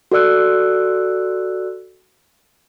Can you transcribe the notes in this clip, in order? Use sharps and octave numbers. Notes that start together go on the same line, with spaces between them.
F#4 A4 D5 E6 F#6